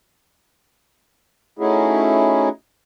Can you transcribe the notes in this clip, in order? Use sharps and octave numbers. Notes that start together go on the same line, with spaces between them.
A3 C#4 D#4 E4 F#4 G#4